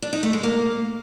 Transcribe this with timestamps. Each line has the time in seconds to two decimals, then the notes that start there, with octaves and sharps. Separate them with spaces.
0.02 D4
0.13 D#4
0.23 A3
0.33 G#3
0.43 A#3